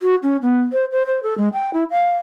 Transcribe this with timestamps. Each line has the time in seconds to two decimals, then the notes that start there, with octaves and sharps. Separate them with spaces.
0.02 F#4
0.23 C#4
0.42 B3
0.72 C5
0.92 C5
1.06 C5
1.23 A4
1.38 G#3
1.53 G5
1.73 E4
1.90 F5